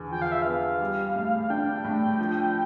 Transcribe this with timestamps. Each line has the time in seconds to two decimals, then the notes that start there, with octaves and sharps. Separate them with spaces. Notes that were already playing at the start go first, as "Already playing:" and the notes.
Already playing: E2 D3
0.11 F3 G5
0.22 F5
0.32 E5
0.42 B3 F5
0.81 G3
1.16 A2
1.50 D4 G5
1.84 A2
2.19 F3